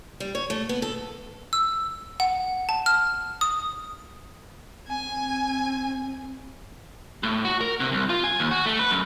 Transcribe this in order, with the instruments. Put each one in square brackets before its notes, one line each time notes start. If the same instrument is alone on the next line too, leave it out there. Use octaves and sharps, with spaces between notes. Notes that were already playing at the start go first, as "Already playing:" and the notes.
[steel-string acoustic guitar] G3
C#5
A3
B3
A4
[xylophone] E6
F#5
A5
F6
D#6
[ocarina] C4 [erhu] G#5
[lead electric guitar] A2
F#4
A#4
C3
C2
F4
G#5
D#2
F#4
A3
B4
F#2